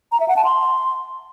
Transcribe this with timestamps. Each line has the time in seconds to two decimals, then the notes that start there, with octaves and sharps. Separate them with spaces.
0.12 A#5
0.20 E5
0.28 F#5
0.36 A5
0.45 C6